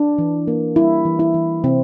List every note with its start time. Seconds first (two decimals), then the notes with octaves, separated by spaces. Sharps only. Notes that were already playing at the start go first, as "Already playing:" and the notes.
Already playing: D4
0.18 E3
0.47 A#3
0.76 G3 E4
1.05 E3
1.19 E4
1.34 E3
1.64 C3 C4